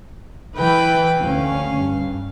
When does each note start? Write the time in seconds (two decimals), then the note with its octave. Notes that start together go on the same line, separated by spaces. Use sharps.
0.56 E3 B4 G5 B5
1.22 D2 C#4 F5
1.75 G2